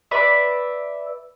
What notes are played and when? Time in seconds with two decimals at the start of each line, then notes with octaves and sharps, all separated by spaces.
0.11 B4 D5 E5